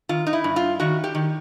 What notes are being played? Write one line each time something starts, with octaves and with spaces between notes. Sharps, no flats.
D#3 F4
D#4
E4
G2
F4
D#3 F#4
G4
D#3